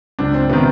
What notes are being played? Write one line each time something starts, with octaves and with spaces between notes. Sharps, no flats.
C#2 D4
C4
C3 D#3 B3